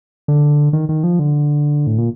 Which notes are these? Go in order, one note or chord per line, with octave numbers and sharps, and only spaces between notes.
D3
D#3
D#3
F3
D3
A2
A#2